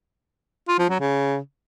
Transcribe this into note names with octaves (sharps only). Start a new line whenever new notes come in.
F4
F3
F#3
C#3